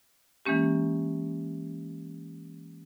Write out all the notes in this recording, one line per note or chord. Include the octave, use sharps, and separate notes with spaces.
E3 G#3 A#3 C#4 G4